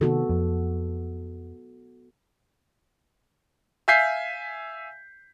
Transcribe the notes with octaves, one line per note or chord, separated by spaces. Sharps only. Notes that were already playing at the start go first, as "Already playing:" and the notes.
C3 D#3 B3 F#4 A4
F2
E5 F5 G#5 G6 B6 C7